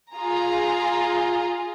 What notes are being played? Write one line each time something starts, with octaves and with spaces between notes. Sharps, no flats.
F4 G#4 A#5